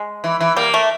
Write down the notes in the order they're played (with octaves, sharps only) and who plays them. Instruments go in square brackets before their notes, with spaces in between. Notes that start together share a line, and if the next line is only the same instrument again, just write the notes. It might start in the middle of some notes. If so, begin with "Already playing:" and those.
Already playing: [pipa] G#3
[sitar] E3
E3
[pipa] G3 [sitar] A#3
[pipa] A3